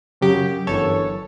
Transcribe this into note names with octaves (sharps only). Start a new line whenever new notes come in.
F#2 C#3 F#3 G4
G1 F#2 E3 A4 C#5